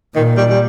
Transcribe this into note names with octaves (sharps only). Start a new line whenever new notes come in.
A#2 D#3
G3
G3